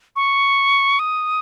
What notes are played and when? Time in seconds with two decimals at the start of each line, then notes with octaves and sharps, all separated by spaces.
0.16 C#6
0.99 D#6